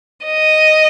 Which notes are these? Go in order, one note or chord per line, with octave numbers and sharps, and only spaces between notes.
D#5